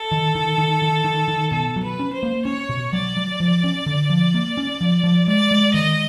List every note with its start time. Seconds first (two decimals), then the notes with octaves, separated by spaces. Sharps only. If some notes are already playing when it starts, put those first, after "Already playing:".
Already playing: A4
0.12 D#3
0.35 D#3
0.58 D#3
0.82 D#3
1.05 D#3
1.28 D#3
1.52 B2 A4
1.76 F#3
1.83 B4
2.00 C#4
2.15 C5
2.23 A#3
2.45 C#4 C#5
2.69 B2
2.93 F#3 D5
3.17 F#3
3.40 F3
3.64 C#4
3.86 D3
4.10 F3
4.34 A#3
4.57 C#4
4.81 F3
5.04 F3
5.28 G#3 D5
5.51 G#3
5.74 D#3 D#5